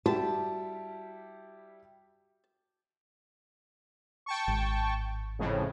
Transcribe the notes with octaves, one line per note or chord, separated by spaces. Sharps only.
G3 E4 F#4 G4 A5
G5 A5 C#6
G#1
F2 A2 C#3